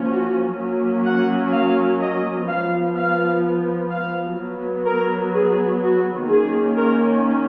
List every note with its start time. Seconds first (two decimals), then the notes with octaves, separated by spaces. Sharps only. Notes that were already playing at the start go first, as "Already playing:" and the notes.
Already playing: F3 A#3 C#4
0.10 F#4
0.57 F#3 A#3 C#4
1.05 F#5
1.53 F5
2.01 D#5
2.48 F3 B3 F5
2.96 F5
3.92 F5
4.39 F#3 B3
4.86 A#4
5.34 G#4
5.82 F#4
6.29 D#3 A#3 C#4 G#4
6.77 A#4